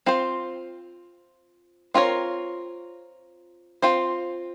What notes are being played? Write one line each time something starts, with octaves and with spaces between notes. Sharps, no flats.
C4 F4 C5
C4 F4 A#4 C#5
C4 F4 C5